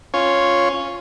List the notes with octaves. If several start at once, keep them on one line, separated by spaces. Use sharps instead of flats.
C#4 F4 C#5